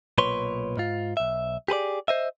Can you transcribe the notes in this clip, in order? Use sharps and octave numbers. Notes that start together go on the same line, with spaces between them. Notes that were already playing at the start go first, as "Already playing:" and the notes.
B1 A#2 B4 C#5 C6
G#2 F4
B1 E5
G4 G#4 B4 D5
C5 D#5 E5